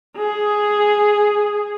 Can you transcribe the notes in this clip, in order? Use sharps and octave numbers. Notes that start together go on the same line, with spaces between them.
G#4